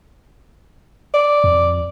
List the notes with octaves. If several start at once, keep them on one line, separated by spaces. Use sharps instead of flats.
D5
F2